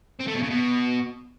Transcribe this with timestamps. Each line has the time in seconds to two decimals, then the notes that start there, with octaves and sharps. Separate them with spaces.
0.19 C4
0.27 A3
0.34 B2
0.42 C#3
0.49 B2